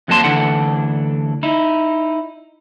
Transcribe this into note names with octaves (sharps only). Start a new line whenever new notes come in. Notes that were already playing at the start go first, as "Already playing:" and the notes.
F2 F#3 A#3 D4 A5 C6
D2 E3 D4 A4 F#5
D#4 E4